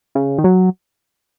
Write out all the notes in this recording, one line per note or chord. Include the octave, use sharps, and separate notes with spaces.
C#3
D#3
F#3